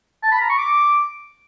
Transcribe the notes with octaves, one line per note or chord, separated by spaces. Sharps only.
A5
B5
A#5
C#6
D6